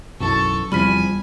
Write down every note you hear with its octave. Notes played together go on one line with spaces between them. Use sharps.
B1 F#2 E3 A4 C#6
E2 C3 F3 G3 G#5 B5 F6 B6